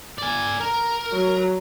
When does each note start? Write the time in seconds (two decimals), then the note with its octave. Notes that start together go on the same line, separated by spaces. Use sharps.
0.18 D5 G#5
0.60 A#4
1.12 F#3